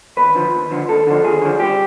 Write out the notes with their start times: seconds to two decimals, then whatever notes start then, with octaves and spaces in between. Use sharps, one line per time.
0.17 D#2 B4
0.35 D3 F3
0.53 D#2
0.71 D3 F3
0.88 D#2 A4
1.07 D3 F3
1.24 D#2 G#4
1.41 D3 F3
1.60 C2 G4